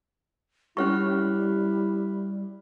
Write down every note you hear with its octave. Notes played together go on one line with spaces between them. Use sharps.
G3 C#4 E4 G4 C#5 C#6 F6 F#6